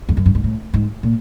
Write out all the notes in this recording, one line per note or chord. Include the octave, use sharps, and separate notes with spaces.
F2
F#2
G2
G#2
A2
G#2
A#2